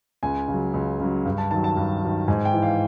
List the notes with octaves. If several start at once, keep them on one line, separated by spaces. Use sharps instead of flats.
C#2 G#5
C#3 F#3
C#2
C#3 F#3
G2
A5
D#3 F#3 A5
A5
G2
D#3 F#3
G#2 G#5
G5
E3
F5